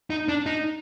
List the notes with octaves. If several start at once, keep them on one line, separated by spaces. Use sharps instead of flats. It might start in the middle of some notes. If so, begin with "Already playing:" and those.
D#4
D4
D#4